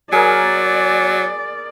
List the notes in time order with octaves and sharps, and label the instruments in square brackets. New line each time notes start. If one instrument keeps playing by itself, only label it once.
[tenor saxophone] F#3 [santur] G#4 A#4 [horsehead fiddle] D5